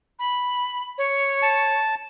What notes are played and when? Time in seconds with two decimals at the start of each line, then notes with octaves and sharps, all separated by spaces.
0.19 B5
0.98 C#5
1.42 A5